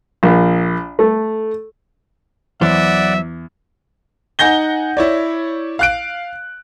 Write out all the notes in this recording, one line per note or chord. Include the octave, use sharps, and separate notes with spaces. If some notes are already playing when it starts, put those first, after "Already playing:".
A#1
A3
E2 F#3 C5 D5 E5 F#5
D#4 F#5 G#5 G6 A#6 G7
E4 C#5 D5
F5 F#6 D7